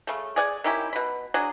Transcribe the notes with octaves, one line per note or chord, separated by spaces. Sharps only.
C#3 A3
G#4 D5 F#5 G#5
D#3 C#4 E4 G4
B2 B5
F#3 D4 G#4